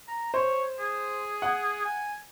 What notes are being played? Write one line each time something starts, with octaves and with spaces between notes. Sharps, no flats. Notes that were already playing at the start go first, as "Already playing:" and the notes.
A#5
C5 C#5
G#4
F#5
G#5